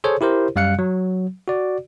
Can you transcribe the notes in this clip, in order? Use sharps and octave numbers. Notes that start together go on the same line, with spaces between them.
G#4 A4 C5 C#5
E4 G4 A#4 C5
F#2 G3 F5 F#6 C#7
F#3
F#4 D5